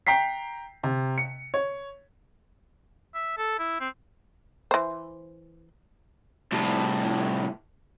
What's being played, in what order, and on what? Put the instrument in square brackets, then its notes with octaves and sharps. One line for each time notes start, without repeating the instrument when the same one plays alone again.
[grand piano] G5 A#5 B6 C7
C3
C#7
C#5
[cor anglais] E5
A4
E4
C4
[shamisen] E3 C5
[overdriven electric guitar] C2 A2